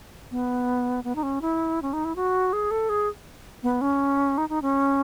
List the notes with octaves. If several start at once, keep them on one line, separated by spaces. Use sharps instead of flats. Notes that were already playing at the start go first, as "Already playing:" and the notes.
B3
B3
D#4
C#4
E4
C#4
D#4
E4
F#4
G#4
A4
G#4
B3
C#4
D#4
D#4
C#4